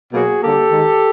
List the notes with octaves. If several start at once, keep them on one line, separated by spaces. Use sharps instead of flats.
B2 F#3 A#3 F#4 G#4
D3 G3 A#3 G4 A4
D#3 G#3